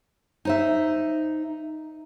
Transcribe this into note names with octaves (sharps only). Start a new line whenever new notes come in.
D#4 C5 E5